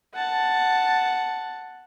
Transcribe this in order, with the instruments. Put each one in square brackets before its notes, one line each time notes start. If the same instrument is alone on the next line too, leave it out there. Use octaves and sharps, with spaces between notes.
[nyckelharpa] F#5 A5